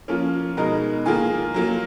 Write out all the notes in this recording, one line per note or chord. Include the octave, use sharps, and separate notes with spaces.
F3 A#3 C#4 F4
B2 G#3 D#4 A#4
D#3 A#3 F4 G#4
F#3 A#3 F4